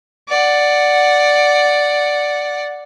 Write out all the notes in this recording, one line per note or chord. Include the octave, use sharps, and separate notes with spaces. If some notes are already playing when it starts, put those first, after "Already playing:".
D5 F#5